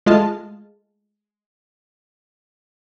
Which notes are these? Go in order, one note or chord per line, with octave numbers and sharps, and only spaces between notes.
G#3 A3 F4 D#5 A5 F6